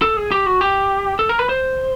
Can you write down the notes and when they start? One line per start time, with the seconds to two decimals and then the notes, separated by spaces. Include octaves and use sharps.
0.02 A4
0.17 G#4
0.32 G4
0.46 F#4
0.61 G4
1.19 A4
1.29 A#4
1.39 B4
1.49 C5